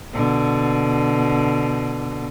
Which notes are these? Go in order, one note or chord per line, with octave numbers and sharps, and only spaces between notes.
B2 D3